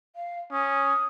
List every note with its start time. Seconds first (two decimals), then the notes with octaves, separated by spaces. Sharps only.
0.15 F5
0.52 C#4 D#6